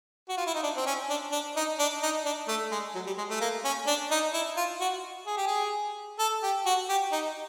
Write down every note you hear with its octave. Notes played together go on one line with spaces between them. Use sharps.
F#4
F4
E4
D#4
D4
C4
C#4
D4
D4
D#4
D4
D#4
D4
A3
G#3
F#3
G3
G#3
A3
A#3
C#4
D4
D#4
E4
F4
F#4
G#4
G4
G#4
A4
G4
F#4
G4
D#4